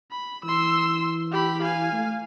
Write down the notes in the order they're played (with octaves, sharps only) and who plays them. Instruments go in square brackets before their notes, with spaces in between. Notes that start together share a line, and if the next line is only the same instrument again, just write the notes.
[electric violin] B5
[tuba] E3 [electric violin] C6 E6
[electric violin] G4 B5
F5 G#5
[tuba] A3